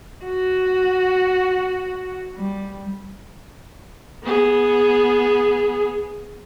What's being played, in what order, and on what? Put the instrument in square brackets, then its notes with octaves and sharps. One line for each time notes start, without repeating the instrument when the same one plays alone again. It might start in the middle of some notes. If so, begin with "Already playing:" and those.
[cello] F#4
G3
[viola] B3 G#4